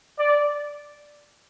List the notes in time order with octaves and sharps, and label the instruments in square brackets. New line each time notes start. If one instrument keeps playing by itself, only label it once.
[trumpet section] D5